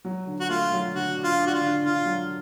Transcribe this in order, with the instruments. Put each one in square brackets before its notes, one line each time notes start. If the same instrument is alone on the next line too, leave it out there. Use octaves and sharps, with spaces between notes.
[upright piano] F#3
D3
[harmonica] F#4
[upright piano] A3 [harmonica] F4
[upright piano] F#3
[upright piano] D3 [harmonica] F#4
[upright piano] D4
[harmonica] F4
[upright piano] D4
[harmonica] F#4
F4
[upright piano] D3
[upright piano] D3 [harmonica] F4
[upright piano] F#3